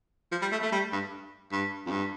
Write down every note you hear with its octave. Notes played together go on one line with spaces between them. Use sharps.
F3
G3
A3
A3
G3
G2
G2
F2
G2